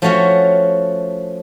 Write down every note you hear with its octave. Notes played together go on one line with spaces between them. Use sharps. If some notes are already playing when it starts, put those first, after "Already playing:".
F3 A3 C#4 F#4 C#5